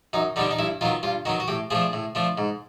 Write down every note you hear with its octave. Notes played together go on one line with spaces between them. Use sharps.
F#2 D#4
D3 G3 B3 D4 D#4
D#4
G2 E4
D#3 F#3 B3 F4
G2 F4
D#3 F#3 B3 F#4
F#4
A2 G4
F3 A3 D4 G#4
A2
F3 A3 D4
G#2